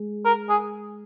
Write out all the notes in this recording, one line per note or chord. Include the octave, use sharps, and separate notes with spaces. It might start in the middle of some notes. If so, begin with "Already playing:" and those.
Already playing: G#3
A#4
G#4